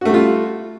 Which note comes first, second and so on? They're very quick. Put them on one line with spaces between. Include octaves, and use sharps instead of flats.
F#4 A3 G3 F4